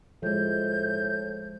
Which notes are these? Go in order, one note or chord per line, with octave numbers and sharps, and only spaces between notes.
A2 F3 G#3 G6